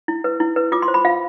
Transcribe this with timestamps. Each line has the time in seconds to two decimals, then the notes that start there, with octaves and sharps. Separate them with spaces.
0.08 E4
0.24 B4
0.40 E4
0.56 B4
0.72 F4 D6
0.82 C6
0.88 C5
0.94 B5
1.05 F4 F5